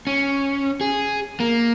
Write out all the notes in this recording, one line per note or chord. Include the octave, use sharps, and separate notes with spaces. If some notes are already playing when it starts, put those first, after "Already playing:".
C#4
G#4
A#3